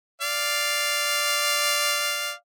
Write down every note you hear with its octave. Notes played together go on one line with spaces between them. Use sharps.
D5 F5